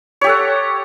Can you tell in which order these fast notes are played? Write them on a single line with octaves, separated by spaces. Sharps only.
C#5 G4 A4 F#5